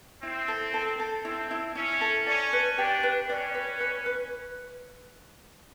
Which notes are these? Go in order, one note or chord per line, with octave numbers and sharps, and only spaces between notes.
C4 E4
A4
A4
A4
C4 E4
E4
C#4 E4
A4
C#4 D5
B4
D4 G4
B4
C#4 D5
B4
B4
B4